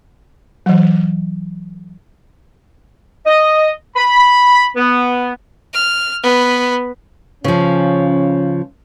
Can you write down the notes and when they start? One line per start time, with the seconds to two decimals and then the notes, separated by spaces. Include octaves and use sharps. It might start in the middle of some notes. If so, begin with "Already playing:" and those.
0.66 E3 F#3
3.26 D#5
3.96 B5
4.77 B3
5.74 F6
6.23 B3 B4
7.44 C#3 F3 C#4